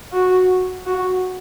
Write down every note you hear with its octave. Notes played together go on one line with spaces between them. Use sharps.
F#4
F#4